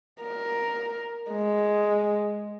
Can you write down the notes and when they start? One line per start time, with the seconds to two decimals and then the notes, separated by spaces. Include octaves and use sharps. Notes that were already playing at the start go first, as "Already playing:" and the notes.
0.23 A#4
1.31 G#3